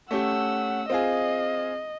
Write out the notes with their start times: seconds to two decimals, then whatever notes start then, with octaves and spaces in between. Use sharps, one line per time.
0.11 A3 C#4 G4 F#5 E6
0.90 C4 F4 G#4 D#5